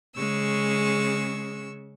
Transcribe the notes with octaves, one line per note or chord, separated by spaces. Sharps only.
C#3 G#3 C#6 E6